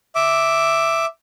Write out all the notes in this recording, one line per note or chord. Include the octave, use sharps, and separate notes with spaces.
E5 D6